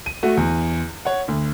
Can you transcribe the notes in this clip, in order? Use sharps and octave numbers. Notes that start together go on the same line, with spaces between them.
D#7
A3 F#4
E2
C#5 F#5
D2